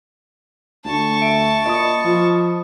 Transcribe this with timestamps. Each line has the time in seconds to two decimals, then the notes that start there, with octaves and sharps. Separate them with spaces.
0.85 D2 A5 C#6
1.22 E5 D7
1.66 A#2 D#5 B5 D#6
2.04 F3